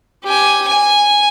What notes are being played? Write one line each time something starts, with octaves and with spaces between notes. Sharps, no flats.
G4 G#5
G#5